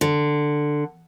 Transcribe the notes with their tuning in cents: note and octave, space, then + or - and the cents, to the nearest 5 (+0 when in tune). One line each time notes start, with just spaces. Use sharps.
D3 +10